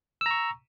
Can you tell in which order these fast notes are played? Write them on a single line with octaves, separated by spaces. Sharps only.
E6 A#5 C#6